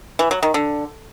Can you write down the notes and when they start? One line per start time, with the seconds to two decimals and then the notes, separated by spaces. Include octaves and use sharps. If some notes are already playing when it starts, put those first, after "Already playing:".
0.19 E3
0.31 F#3
0.43 D#3
0.54 D3